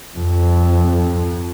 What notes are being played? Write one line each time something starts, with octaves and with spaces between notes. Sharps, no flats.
F2